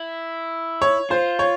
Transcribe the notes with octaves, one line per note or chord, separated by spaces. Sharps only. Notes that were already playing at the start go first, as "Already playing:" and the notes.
Already playing: E4
C#5
F4 C5
C#5